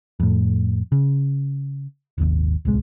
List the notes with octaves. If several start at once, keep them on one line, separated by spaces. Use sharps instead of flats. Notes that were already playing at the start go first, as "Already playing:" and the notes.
F2 A2
C#3
D#1 G#1 D#2
D1 C2 G#3